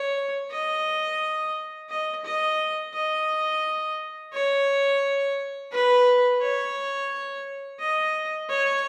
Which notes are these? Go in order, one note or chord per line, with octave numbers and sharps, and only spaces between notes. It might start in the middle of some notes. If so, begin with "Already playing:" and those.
Already playing: C#5
D#5
D#5
D#5
D#5
C#5
B4
C#5
D#5
C#5